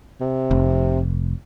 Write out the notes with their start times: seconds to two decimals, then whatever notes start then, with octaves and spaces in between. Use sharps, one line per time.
0.21 C3
0.51 F1